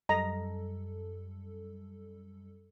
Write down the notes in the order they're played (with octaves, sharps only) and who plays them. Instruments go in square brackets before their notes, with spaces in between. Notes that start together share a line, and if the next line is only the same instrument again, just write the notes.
[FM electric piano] F#2 G3 A4 [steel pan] D#5 A#5